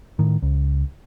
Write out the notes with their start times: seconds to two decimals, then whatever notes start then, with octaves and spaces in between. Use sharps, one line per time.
0.19 A2 D#3
0.42 C#2